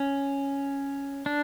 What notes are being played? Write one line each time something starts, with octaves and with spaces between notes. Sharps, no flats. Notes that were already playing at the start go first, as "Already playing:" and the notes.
Already playing: C#4
D4